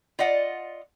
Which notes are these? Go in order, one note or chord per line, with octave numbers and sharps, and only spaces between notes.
F4 D5 D#5 F#5